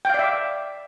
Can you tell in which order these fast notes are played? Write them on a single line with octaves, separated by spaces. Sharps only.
G5 F5 D5 E5 D6